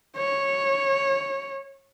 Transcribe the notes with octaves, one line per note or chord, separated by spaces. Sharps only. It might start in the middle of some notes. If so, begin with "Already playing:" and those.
C#5